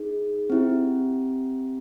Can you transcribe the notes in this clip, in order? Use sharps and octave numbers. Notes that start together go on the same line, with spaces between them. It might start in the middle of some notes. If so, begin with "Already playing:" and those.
Already playing: D#4 G#4
C4 E4 G4